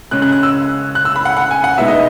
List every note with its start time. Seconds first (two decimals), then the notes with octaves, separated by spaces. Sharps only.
0.11 C#3 G#3 C#4 F#6
0.22 F#6
0.32 F#6
0.43 E6
0.95 F#6
1.05 E6
1.16 B5
1.25 F#5
1.37 F#5
1.51 G#5
1.64 F#5
1.78 B2 G#3 B3 D#4 E5
1.88 D#5